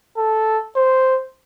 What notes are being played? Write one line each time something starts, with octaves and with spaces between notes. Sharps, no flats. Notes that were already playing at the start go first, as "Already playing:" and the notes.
A4
C5